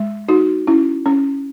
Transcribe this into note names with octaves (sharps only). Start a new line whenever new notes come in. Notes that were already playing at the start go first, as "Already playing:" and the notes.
Already playing: G#3
D#4 F#4
C#4 E4
C#4